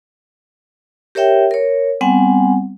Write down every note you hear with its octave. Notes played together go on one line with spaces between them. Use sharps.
G4 A#4 C#5 E5 G5
A#4 C#5
G3 B3 C4 F#5 G#5